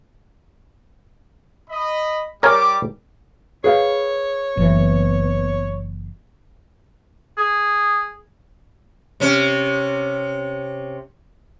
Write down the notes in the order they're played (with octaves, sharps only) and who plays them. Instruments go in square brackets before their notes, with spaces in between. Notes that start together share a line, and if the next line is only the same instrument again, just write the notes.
[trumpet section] D#5 B5
[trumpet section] G3 D6 [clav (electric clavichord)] A#4 C#5 G#5
[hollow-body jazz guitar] G#4 B4 F5 [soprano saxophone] C#5
[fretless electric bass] F#1 E3 [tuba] B3
[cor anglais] G#4
[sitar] C3 C#4